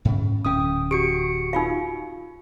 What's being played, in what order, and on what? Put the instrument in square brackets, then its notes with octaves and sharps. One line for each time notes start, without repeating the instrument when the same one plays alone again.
[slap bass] G#2 C#3
[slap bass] D1 C#4 [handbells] G5 D#6
[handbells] F#4 C#7 D7 [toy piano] G4
[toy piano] D#4 F4 F5